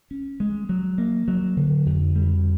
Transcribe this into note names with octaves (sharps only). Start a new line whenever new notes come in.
C#4
G#3
F#3
A#3
F#3
D3
F2
G3